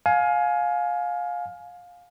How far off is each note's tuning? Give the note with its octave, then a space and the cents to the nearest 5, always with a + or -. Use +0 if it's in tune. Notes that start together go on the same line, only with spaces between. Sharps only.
F5 +20 G#5 +20